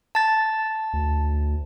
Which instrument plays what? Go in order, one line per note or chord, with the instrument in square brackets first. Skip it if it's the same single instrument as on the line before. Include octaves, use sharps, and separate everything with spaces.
[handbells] A5 A6
[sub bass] D2